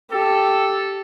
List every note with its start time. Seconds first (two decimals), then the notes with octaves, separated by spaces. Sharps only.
0.11 G4 A4